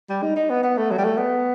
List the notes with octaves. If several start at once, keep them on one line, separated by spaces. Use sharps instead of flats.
G3
D#4
D#4
B3
B3
A3
F#3
G3
A3
B3